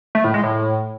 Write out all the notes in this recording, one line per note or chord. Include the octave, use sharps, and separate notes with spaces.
A3
A2
G#3
A2